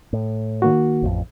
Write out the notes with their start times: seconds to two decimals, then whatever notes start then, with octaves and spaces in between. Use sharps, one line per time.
0.13 A2
0.62 D#3 A#3 F#4
1.02 A1 F2